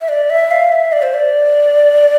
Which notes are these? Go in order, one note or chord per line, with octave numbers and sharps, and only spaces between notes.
E5
D5
E5
F5
E5
D5
C5
D5